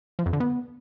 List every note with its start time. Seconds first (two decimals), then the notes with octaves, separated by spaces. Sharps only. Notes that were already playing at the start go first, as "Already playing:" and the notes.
0.19 F3
0.26 F2
0.33 D3
0.40 B3